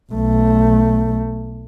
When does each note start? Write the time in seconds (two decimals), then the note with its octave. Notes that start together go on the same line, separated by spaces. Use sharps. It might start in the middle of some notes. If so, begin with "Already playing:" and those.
0.13 B1 A3